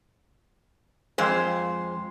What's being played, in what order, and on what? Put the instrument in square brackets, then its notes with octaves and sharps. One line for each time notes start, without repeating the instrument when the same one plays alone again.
[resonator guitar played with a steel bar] F2 G#3 C5